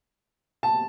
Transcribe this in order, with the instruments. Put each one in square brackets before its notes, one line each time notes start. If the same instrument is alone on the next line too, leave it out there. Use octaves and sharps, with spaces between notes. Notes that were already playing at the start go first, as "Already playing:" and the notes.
[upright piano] A5